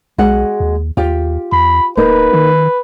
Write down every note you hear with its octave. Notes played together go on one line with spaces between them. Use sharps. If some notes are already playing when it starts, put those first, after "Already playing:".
B1 G#3 F#4 F#5
D#2
D#2 F4 G4
E2 B5
D1 A#3 D#4 B4
D#3